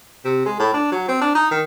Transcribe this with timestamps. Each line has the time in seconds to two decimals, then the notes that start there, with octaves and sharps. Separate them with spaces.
0.25 C3
0.46 G#3
0.59 A2
0.73 D4
0.92 F#3
1.08 C4
1.21 D4
1.35 D#4
1.51 D#3